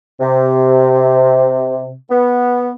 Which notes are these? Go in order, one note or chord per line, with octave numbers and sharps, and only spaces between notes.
C3
B3